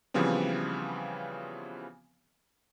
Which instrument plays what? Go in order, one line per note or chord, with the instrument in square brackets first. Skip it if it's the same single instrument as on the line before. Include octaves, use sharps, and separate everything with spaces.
[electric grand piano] C#3 E3 F3 G3 B3 C4